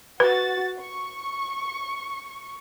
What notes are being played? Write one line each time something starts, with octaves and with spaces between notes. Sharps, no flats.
F#4 B4 A6
C#6